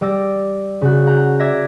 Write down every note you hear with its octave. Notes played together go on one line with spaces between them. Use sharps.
G3 D5 E6 A#6
C#3 F#4
F#5 A#5 G6
D5 E5 G#6 A#6